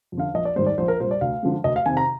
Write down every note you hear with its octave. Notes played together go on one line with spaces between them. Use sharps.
F2
D3 F5
A#1 D#5
D5
G#2 D#3 G3 C5
D5
A#1 C5
A#4
A#2 G3 C5
D5
D2 F5
D3 F3 G#3
D2 D#5
F5
C3 D#3 G#5
A#5